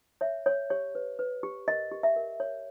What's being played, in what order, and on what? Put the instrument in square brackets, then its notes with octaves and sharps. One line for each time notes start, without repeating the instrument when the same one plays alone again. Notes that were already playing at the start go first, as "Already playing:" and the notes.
[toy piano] C#5 E5
C#5
G4 C#5
B4
B4
G4
A#4 D#5
G4
E5
A#4
C#5